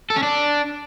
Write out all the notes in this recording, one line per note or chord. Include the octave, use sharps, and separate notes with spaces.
A4
C#4
D4